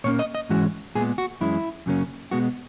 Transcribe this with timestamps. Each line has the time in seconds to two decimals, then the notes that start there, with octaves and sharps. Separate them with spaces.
0.04 A#2 A#3 C#4 C#5
0.19 D#5
0.35 D#5
0.49 G#2 E3 G#3 C#4 F#4
0.95 A#2 G#3 B3 G#4
1.18 F#4
1.41 F#2 E3 G#3 C#4 E4
1.86 F#2 C#3 F#3 A#3 C#4
2.31 B2 G#3 B3 F#4